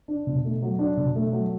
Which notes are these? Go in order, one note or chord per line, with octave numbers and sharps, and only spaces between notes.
D4
B2
A3
F#3
D4
B2
A3
F#3